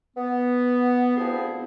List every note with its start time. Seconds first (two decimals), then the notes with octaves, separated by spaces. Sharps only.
0.17 B3
1.17 D2 F3 C4 E4 G4 G#4